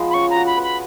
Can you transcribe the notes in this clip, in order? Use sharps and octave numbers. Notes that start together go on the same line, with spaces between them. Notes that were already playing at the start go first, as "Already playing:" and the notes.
Already playing: F3 G#3 B3
B5
C#4 C#6
A#5
F#4
B5
B4
B5